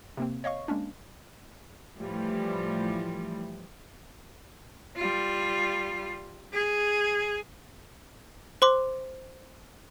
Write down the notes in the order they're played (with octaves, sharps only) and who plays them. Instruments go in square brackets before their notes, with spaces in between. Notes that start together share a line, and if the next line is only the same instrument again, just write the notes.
[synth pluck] C3 A#3 C4
C#5 D#5 F5 C#6
G#3 A#3 C#4 D4
[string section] A2 E3 F3 G3
[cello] G3 F4
G#4
[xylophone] C5 C6 D6